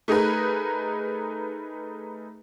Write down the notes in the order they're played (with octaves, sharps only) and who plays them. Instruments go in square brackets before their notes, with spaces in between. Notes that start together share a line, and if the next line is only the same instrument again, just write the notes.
[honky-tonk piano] A3 D#4 G#4 A#4 B4